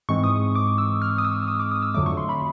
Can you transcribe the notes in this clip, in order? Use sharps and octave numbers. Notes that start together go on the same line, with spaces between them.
G#2 E3 G#3 C4 C#6
D#6
D6
E6
F6
D#6
E6
E6
D#6
D6
D#6
E6
F2 D3 F#3 A3 D6
C#6
C6
B5